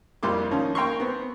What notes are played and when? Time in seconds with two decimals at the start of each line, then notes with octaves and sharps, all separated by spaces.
0.23 C2 F2 G3 A#3 C6 D6
0.51 D#3 F3 C#4 D#4
0.75 A#3 G5 A#5 C6 C#6
1.00 B3 C4